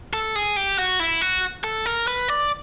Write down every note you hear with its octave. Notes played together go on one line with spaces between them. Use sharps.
A4
G#4
G4
F#4
E4
F#4
A4
A#4
B4
D5